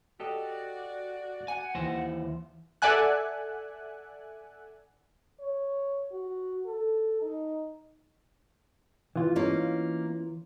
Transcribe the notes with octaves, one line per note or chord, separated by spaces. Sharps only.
F#4 G4 A4 D5 D#5
F#5 G#5
D#2 E3 C5
A4 D5 E5 F#5 G#5 F#6
C#5
F#4
A4
D#4
E3 F4
A#3 C#4 D#4